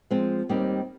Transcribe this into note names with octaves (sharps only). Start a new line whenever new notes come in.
F3 G#3 C4
D#2 D#3 G3 C4 D#4